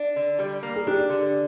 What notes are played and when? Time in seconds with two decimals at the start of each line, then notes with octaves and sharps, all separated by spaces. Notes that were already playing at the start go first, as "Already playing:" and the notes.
Already playing: D4
0.16 D3
0.39 G3
0.63 A#3
0.76 G#4
0.87 D4 G4
1.10 D3